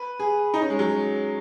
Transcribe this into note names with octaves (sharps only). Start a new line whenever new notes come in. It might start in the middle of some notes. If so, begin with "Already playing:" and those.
Already playing: B4
G#4
D#4
C#4
G#3
F#3